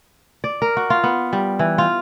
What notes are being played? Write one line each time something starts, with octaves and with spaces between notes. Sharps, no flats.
D5
A#4
F#4
F4
B3
G3
E3
F4